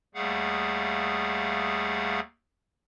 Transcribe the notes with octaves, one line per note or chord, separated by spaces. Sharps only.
D#2 G3 A3 G#4 F5 F#5